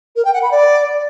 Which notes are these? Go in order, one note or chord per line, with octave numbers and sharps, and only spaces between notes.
A#4
G5
F#5
B5
D5